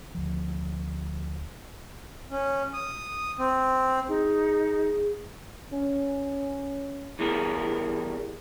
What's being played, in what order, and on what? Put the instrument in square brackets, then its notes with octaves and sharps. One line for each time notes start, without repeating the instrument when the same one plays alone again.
[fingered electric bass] D2 F3
[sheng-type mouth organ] C#4
D#6
C4
[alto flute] D#4 [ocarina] G#4
[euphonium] C#4
[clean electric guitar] E3 G3 B3 G#4 A#4